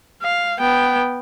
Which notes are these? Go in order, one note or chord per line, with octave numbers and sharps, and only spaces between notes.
F5
B3 G5